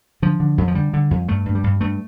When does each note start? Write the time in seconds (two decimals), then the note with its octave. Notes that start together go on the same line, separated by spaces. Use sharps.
0.22 D3 F3
0.40 D3
0.58 F2
0.68 F3
0.75 D3 G3
0.93 D3
1.11 F2
1.28 G2 A3
1.46 G2
1.55 G3
1.64 G2
1.81 G2 A3